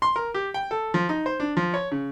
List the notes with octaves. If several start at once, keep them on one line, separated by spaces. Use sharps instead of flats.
C6
A#4
G4
G5
A4
F3
D#4
C5
D4
F3
C#5
C#3